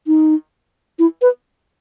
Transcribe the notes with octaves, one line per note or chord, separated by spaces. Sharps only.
D#4
E4
B4